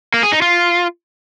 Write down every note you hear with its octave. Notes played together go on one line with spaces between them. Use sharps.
A#3
G#4
D#4
F4